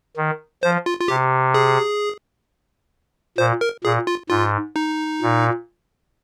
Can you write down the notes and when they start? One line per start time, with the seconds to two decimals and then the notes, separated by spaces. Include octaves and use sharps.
0.17 D#3
0.63 F3 C5
0.86 F4
1.00 F4
1.08 C3 G4
1.54 G#4
3.38 A#2 C5
3.61 A#4
3.84 A#2 G#4
4.07 F4
4.30 G#2 F4
4.76 D#4
5.22 A#2